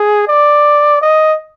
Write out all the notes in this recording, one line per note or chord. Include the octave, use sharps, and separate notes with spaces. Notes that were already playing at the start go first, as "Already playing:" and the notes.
Already playing: G#4
D5
D#5